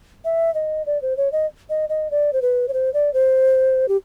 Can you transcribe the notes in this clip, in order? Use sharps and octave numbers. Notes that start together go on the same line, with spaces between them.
E5
D#5
D5
C5
C#5
D#5
D#5
D#5
D5
C5
B4
C#5
C5
D5
C5
G4